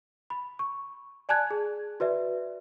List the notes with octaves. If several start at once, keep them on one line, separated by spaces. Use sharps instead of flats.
B5
C#6
D5 G#5 A5 F#6 G#6
G#4
F#4 B4 D5 E5